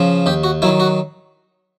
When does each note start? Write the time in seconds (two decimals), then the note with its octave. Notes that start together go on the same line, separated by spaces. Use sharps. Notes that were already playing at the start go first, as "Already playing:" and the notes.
Already playing: C#3 F3
0.26 D#2 G4
0.44 F#4
0.62 D#3 F#3 E4
0.80 F#4